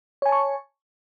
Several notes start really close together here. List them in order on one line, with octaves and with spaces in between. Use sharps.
C#5 G#5 A5 C#6